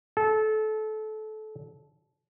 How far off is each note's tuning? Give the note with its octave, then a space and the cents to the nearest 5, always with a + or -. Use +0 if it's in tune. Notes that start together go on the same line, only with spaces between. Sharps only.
A4 -25